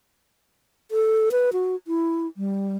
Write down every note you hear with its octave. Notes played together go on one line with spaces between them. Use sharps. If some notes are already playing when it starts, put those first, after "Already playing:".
A4
B4
F#4
E4
G3